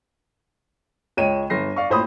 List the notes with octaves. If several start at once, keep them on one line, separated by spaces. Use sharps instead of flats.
C#2 C#5 D#5 G5 D#7 E7
G1 A#6 C7
D5 F5 C#6
A1 A#2 C5 B5 D#6